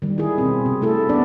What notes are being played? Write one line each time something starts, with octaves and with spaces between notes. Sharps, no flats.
D#3 G3
E4 G#4
B2 C4
C3
A3 E4 A4
B3 D4 D5